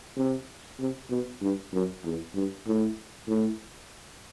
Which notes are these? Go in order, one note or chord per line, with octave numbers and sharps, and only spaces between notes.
C3
C3
B2
G2
F#2
E2
G2
A2
A2